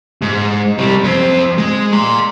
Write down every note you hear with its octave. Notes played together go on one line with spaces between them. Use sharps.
G#2
C3 G3
F2 C4
G#3
A#5 C6